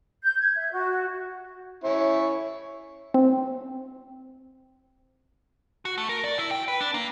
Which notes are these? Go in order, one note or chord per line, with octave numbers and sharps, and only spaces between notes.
G6
G#6
E5
F#4
C#4 E4 C#5
C4
F#4
A3
A#4
D5
E4
G5
B4
D4
A#3